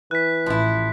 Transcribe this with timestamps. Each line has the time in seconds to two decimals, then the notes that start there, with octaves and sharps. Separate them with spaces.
0.11 E3 F#6 B6
0.46 A1 F3 E4